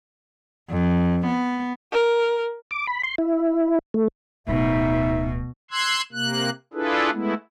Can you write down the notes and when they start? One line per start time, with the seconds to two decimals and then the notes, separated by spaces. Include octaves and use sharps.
0.70 F2
1.26 B3
1.92 A#4
2.71 D6
2.87 B5
3.03 C6
3.18 E4
3.94 A3
4.48 D1 B2 D#4 E5
5.71 C6 E6 F#6 G#6
6.12 C3 A#3 F#6
6.74 D4 E4 F4 G#4 A4 B4
7.12 G#3 A3 B3 E4